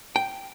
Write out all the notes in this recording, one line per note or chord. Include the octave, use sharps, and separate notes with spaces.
G5